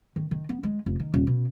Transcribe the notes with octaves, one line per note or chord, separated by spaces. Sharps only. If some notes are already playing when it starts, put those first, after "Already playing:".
D#3
D#3
B3
G#3
F1
D#3
D#1
B2